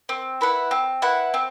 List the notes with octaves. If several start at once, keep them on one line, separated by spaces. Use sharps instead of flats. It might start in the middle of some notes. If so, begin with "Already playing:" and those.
C4
E4 B4 F#5
C4
E4 B4 F#5
C4